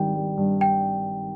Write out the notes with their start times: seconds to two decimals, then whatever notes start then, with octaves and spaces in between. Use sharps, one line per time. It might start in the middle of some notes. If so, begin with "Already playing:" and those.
Already playing: G#1 D#3 G3 G5
0.15 G3
0.37 G2
0.61 G5